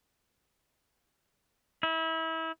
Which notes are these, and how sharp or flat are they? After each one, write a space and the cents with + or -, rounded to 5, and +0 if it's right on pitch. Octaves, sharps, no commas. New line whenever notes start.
E4 -30